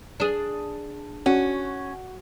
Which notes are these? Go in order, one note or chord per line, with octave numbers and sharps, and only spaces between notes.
D4 G#4
C#4 F#4